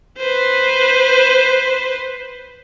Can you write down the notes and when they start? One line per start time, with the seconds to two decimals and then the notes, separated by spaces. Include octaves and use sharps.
0.18 B4 C5